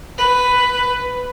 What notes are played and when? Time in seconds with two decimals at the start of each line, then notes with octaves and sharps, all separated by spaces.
0.18 B4